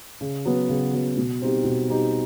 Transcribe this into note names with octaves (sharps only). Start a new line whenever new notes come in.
C#3
F#3 B3
C#3
F#3 B3
B2
G3 C4 D#4 G4
B2
G3 C4 D#4 G4